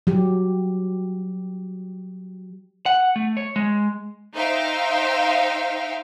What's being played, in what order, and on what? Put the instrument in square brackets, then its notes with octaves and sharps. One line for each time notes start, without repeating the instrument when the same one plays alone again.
[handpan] F#3 G4
[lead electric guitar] F#5
A3
C#5
G#3
[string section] D#4 C5 E5 F5 G5